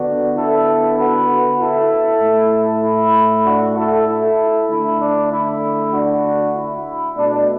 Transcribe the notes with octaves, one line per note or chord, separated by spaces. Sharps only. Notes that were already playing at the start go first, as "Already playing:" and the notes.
Already playing: D3 B3 D4 F#4
E4 A4
F#4 B4
E4 A4
A2 A3
E4
D4 F#4
E4 A4
E4 A4
D3 A3 E4
D4
E4
D4 F#4
E4
B2 A3 D4